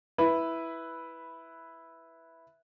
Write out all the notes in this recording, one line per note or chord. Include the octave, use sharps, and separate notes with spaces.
E4 B4